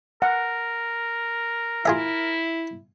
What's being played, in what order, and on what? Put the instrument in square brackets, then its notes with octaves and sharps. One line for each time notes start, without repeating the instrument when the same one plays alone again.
[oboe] A#4 [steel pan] F#5
[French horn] E4 [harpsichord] F4 G#4 E5